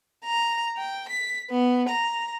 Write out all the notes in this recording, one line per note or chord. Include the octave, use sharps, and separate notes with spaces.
A#5
G5
B6
B3
A#5